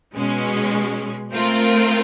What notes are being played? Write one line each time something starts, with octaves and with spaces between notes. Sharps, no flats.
B2 G#3 C#4
A3 C4 F4 A#4